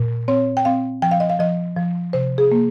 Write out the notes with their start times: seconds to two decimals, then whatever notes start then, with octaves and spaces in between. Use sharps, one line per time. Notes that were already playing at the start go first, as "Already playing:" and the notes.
Already playing: A#2
0.28 C4 C#5
0.57 G5
0.65 C4 F5
1.02 F3 G5
1.11 F5
1.20 D#5
1.30 F5
1.40 F3 D#5
1.77 F3
2.13 C3 C5
2.38 G#4
2.52 A#3